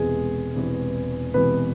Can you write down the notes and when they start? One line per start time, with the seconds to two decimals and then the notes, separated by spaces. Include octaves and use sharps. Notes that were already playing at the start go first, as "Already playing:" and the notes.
Already playing: E1 E2 C3 E3 G#3 G#4
0.55 E1 E2 C3 E3
1.34 E1 E2 C3 E3 B3 B4